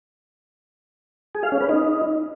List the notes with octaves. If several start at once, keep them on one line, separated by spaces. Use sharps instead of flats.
G#4
F5
C#4
B4
D#4